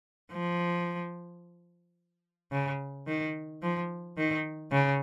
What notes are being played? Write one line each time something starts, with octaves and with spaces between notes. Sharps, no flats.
F3
C#3
D#3
F3
D#3
C#3